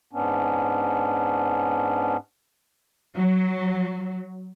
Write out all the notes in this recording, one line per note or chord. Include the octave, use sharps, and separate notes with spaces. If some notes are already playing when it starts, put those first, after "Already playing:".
G#2 B3 C#4 D4
F#3